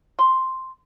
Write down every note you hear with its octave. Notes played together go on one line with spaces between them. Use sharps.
C6